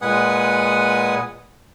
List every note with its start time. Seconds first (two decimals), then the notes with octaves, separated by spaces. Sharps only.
0.02 A#2 G#3 B4 F#5 G#5 D#6